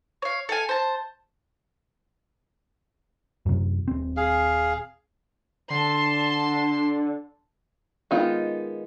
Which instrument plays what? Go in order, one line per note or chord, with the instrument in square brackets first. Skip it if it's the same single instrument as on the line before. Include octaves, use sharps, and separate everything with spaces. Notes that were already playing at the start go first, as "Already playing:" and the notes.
[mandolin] C#5 F5
A4 F5 G#5
C5 A5
[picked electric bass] F#2 C3
D#1 C4
[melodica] G#4 F5
[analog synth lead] D3 [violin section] A5 C6
[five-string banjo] D#3 G#3 B3 D#4 F4